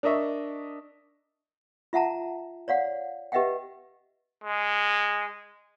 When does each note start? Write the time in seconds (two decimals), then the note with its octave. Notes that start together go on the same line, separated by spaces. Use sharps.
0.03 D4 A#4 D#5 E5 C#6
1.93 F4 E5 F#5 A5 A#5
2.68 C#5 D5 F5 F#5
3.32 G4 B4 D#5 E5 F#5 G5
4.44 G#3